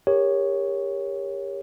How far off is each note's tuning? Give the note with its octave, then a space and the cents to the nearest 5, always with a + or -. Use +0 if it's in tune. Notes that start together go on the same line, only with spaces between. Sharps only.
G4 +30 A#4 +0 C#5 +0